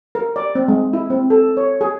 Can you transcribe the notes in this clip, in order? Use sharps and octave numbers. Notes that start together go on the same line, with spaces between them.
A#4
D5
C4
G#3
E4
C4
A4
C#5
G#4